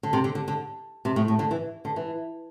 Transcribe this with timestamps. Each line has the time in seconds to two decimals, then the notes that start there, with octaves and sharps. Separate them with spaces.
0.03 D3
0.13 C3
0.24 D3
0.35 D3
0.48 D3
1.05 C3
1.16 A2
1.28 A2
1.39 D3
1.51 E3
1.85 D3
1.96 E3